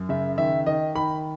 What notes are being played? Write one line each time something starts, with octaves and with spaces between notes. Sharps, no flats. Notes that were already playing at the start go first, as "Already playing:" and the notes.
Already playing: F#2
C#3 E5
D#3 E5
D#3 D#5
D#3 B5